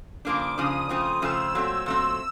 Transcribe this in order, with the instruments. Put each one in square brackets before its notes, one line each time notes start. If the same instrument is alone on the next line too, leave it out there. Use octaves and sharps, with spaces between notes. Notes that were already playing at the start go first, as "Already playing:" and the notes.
[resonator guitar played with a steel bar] C#3 F3 A#3 D4 [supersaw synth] D6
[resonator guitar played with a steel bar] C#3 F3 A#3 D4 [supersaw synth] D#6
[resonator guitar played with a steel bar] C#3 F3 A3 C4 F4
[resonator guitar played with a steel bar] C#3 F3 A3 C4 F4 [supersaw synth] E6
[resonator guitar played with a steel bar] A#2 F#3 A3 C4
[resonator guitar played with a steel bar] A#2 F#3 A3 C4 [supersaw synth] E6